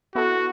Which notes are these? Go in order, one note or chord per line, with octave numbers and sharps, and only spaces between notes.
B3 E4 F#4 A4